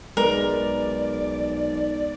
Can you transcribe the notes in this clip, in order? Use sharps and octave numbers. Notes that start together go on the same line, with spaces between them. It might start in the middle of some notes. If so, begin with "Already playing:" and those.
B1 G#3 A#4 B4 D5